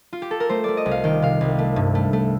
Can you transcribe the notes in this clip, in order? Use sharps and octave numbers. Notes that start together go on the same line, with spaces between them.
F4
G4
A4
A#4
A3 C5
A3 D5
D#5
C2
F5
D#3 G5
C3 F5
C2
A3
G2
A3
A3